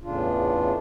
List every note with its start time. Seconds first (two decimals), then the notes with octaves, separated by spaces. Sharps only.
0.02 E2 A2 C#3 D4 F4